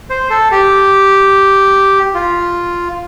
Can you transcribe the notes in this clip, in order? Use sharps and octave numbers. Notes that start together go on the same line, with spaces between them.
C5
A4
G4
F4